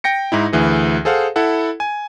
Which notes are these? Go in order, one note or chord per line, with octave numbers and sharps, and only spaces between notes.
G5 A#6 C#7
G#2 D#4 E4
D2 E3 G#4
G#4 A4 C5 F5 F#5
E4 A4 F#5
G#5